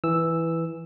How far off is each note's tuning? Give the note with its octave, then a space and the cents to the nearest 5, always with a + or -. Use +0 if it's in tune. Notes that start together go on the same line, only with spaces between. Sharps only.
E3 +0 E6 +0